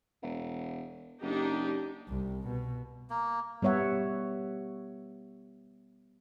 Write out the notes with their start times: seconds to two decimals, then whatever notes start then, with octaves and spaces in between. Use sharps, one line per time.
0.22 E1
1.22 F#1 D4 D#4 G4
2.09 C2
2.47 B2
3.10 A#3
3.62 G3 B3 C#5 E5 F#5